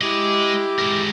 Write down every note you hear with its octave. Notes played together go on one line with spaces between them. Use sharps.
G#3 E4 G4 D#5 D6
G#3 A#4